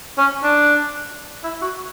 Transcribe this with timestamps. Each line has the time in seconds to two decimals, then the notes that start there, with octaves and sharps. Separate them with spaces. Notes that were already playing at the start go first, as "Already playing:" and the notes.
0.18 C#4
0.43 D4
1.44 E4
1.62 F#4